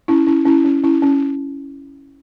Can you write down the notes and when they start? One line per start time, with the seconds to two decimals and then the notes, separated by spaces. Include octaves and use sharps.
0.08 C#4 E4
0.27 C#4 E4
0.46 C#4 E4
0.65 C#4
0.83 C#4 E4
1.02 C#4